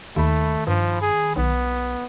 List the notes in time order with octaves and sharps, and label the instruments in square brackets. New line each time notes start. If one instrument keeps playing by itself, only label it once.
[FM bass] D#2 [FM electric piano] D#3 B5 [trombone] A3
[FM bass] G2 [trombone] F3
[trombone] G#4
[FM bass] B1 [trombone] B3